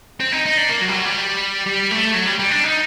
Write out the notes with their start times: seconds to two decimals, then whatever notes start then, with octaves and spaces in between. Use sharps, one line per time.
0.20 C4
0.32 D#4
0.46 D#4
0.57 D4
0.69 A#3
0.81 F#3
0.88 G3
0.93 F#3
1.05 G3
1.66 G3
1.91 A3
2.14 F#3
2.26 G3
2.39 G3
2.50 D4
2.64 D#4